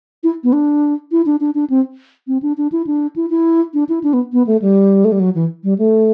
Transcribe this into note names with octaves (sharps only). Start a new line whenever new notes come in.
E4
B3
D4
E4
D4
D4
D4
C4
C4
D4
D4
E4
D4
E4
E4
D4
E4
D4
B3
B3
A3
G3
A3
G3
F#3
E3
G3
A3